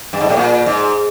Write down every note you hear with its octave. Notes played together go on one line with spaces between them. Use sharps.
G2
G#2
A2
A#2
G#2